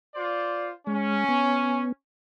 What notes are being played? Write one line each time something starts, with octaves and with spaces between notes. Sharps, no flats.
F4 C5 D5
G#3 C#4
B3